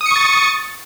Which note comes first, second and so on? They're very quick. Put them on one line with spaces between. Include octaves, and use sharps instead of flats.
D#6 C#7 C#6 A6